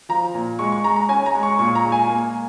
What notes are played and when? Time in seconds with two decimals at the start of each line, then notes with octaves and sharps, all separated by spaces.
0.09 F3 A#5
0.34 A#2
0.59 G#3 C#6
0.72 C#6
0.84 G#3 A#5
0.96 A#5
1.09 C#4 G#5
1.26 A#5
1.35 G#3
1.43 C#6
1.59 A#2 C#6
1.75 A#5
1.84 G#3
1.92 G#5
2.09 A#3